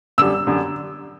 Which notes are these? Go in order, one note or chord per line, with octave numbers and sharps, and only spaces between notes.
F#2 D3 G3 E6
F#2 D3 G3